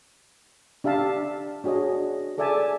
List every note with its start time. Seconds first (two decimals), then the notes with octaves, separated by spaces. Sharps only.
0.84 D4 G4 E5 F5 A5
1.64 D4 F#4 G#4 C#5 D#5
2.38 G#4 A4 D5 E5 G#5 A5